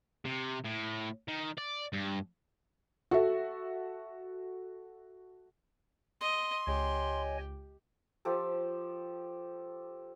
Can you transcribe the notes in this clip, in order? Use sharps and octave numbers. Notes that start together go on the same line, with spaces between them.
C3
A2
D#3
D5
G2
F#4 A4 E5
D#5 C6
C#2 G4 C#5 D#5 G#5
F3 G4 A4